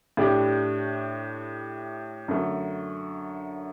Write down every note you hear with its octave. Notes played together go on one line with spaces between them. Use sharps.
A2 A3 D4 G4
F#2 D3 A3